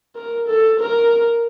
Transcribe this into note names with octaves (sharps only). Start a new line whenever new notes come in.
A#4
A4
A#4